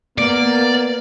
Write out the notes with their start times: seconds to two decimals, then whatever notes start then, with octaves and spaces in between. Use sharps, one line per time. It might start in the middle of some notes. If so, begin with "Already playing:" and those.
0.18 A#3 B3 D5